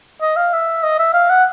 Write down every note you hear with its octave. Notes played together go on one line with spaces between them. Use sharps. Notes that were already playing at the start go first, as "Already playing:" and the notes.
D#5
F5
E5
D#5
E5
F5
F#5